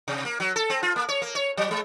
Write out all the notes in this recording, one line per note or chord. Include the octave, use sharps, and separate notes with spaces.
C3
A#3
F#3
A4
C4
F4
A#3
C#5
A#3
C#5
F#3
G#3